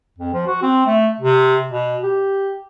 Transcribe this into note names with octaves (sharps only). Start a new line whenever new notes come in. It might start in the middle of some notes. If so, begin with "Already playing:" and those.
F2
F3
F#4
C4
A3
C3
B2
G4